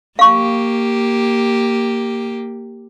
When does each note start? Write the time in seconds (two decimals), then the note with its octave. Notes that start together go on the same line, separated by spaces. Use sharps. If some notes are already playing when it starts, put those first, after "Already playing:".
0.19 A#3 G4 F5 C#6